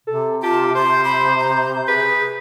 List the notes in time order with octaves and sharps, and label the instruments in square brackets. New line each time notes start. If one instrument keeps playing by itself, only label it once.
[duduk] C3 [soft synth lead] A4
[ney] F4 [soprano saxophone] G4 [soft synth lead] A5
[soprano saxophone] C5 [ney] C6 [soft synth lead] G6
[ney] B5
A#5
[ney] G#4 [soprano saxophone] B4